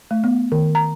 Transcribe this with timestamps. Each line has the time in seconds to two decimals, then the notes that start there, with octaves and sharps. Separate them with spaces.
0.11 A3
0.24 B3
0.52 D#3
0.75 A#5